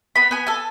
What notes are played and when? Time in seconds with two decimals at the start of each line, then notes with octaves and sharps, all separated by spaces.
0.15 B3 B5
0.31 B3 G#5
0.47 A4 G#5